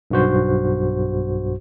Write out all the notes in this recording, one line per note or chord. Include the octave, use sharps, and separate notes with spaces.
B1 G2 F#4 C5